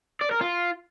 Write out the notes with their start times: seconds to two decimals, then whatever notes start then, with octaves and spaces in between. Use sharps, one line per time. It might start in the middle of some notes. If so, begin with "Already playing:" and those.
0.21 D5
0.31 A#4
0.41 F4